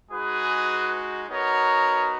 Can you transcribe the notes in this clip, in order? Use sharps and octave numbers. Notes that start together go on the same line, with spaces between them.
G#3 D#4 F#4 G#4 B4
B3 D#4 F#4 A#4 C#5